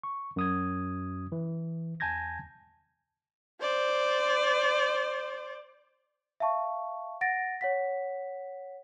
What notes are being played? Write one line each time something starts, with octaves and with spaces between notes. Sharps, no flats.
C#6
F#2 D#6 G#6
E3
E2 G#5 A5 G6 G#6 A#6
C5 D5
E5 F5 A5 C#6
F#5 A6 A#6 D7
C#5 F#5 B6